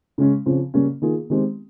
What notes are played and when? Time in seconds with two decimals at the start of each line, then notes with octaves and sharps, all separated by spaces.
0.18 C#3 G#3 C#4
0.46 C#3 F3 C4
0.74 C#3 G3 A#3 C#4
1.02 D#3 A#3 F4 G#4
1.30 D#3 G#3 C4 G4